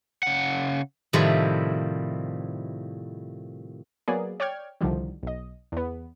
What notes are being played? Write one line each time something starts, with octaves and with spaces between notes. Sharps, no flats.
C#3 F#5
A2 C3 D#3 F3 G3 E4
F#3 A#3 B3 G#4 D5
C#5 D5 G5 C#6 F6 G#6
C2 D3 D#3 F3 G3
B1 D#5
E2 B3